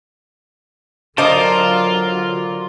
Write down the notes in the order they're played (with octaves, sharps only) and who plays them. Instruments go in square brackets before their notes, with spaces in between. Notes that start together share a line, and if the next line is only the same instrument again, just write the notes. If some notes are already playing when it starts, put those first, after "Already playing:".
[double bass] D3 F#3 [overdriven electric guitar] F4 [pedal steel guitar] A#4 D5 A5 [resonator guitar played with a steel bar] C5 D#5